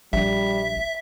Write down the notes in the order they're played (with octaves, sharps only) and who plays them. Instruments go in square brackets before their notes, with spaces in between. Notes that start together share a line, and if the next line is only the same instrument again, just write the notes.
[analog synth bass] A#1 [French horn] G3 [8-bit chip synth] E5